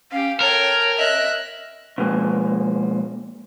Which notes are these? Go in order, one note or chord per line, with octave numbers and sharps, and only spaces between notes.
C#4 G4 F5
A4 A#4 C#5 G5
D#5 E5 F#6
B2 F3 G#3 A#3